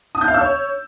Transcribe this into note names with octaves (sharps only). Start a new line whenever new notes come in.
D#6
G6
F5
E6
C#5